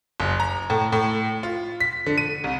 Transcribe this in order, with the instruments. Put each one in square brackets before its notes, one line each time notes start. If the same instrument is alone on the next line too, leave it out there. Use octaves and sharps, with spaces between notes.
[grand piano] F#1
A#5
A2
A2
F4
B6
D3
D#7
C2